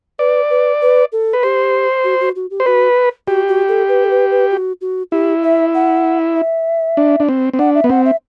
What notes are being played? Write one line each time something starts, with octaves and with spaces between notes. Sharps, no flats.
B4 D5
B4
B4
A4
B4
G4 C5
F#4
F#4
F#4
G4
C5
F#4 B4
F#4 G4
F#4
A4
B4
A4
B4
B4
F#4
F#4
E4 G4
E5
F#5
E5
D4
D4
C4
C4
D4 F#5
E5
B3
C4 F#5
E5